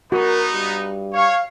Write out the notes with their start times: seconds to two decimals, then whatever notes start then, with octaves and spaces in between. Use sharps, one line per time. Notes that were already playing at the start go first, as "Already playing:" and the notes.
0.12 B3 D#4 F#4 A#4
0.52 G2
1.13 C#5 F5